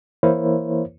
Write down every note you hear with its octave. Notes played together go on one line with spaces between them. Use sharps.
E3 A#3 E4 A#4 C5 C#5